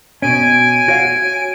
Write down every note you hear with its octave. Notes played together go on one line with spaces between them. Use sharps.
B2 C#4 G#5 D7
F#4 C#5 F5